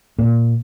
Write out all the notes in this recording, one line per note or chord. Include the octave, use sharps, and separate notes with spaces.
A#2